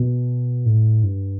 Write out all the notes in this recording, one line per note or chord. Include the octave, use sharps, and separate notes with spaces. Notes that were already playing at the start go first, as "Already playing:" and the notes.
Already playing: B2
A2
G2